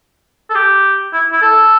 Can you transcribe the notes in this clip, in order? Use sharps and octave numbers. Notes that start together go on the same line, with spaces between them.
A4
G4
E4
E4
A4